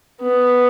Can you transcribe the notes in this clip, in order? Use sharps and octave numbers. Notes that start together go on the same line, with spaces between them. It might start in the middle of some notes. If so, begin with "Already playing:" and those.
B3